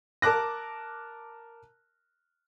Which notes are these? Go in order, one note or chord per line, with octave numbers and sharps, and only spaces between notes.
A#4 A5 D6 F#6 A#6